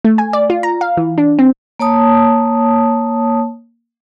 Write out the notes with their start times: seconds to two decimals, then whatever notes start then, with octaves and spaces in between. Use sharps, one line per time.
0.05 A3
0.18 G#5
0.33 D5
0.50 F4
0.63 A#5
0.81 F5
0.97 E3
1.18 D4
1.39 C4
1.79 A#3 C#5 A5 D#6